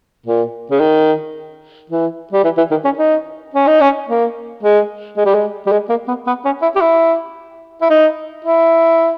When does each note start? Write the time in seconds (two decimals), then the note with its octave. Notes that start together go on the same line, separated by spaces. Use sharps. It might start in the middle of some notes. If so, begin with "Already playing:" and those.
0.26 A#2
0.71 C#3
0.80 D#3
1.90 E3
2.33 G3
2.44 E3
2.58 E3
2.71 D#3
2.85 C#4
2.99 D#4
3.54 C#4
3.67 D#4
3.81 C#4
4.08 A#3
4.63 G#3
5.17 G#3
5.25 G3
5.34 G#3
5.66 G3
5.72 G#3
5.90 A#3
6.08 B3
6.27 B3
6.45 C#4
6.62 E4
6.76 G4
6.81 E4
7.82 E4
7.90 D#4
8.45 E4